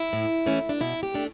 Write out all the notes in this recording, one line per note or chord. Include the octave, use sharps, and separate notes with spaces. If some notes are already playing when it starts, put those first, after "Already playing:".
Already playing: E4
A2
E3 A3 C#4
D4
B2 E4
G4
A3 D4